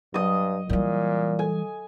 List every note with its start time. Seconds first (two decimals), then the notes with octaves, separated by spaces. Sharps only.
0.14 G2 F#3 D#5 D#6
0.69 A#2 E3 G3
1.39 A4 G#5